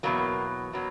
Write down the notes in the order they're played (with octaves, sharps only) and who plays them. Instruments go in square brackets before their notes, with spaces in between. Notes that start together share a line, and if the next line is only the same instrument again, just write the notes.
[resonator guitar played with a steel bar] E2 B2 F#3 A#3
B2 F#3